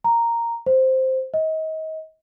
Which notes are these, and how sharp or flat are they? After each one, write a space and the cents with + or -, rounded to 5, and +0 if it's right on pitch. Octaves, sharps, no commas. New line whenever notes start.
A#5 -5
C5 +0
D#5 +30